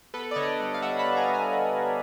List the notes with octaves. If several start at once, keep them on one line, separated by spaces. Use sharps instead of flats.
B3 A4 B4
D5
D3 C#5 D#5
G3
F5
G3 E5 F#5
A5 B5
B3
G#5 A#5
B3
G#5 A#5